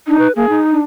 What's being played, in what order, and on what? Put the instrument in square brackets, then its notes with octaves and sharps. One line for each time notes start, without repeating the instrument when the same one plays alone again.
[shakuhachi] D4 [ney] D#4
[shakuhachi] B4
[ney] A#3 [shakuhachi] G#4
[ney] D#4
[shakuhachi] D4